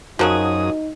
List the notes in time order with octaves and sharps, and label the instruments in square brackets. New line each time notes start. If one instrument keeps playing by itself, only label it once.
[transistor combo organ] F#2 D#6 [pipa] F3 F#3 G#4 [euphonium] D#4 [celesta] F#4 A#4